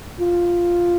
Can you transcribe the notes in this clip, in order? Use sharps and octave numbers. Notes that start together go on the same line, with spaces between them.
F4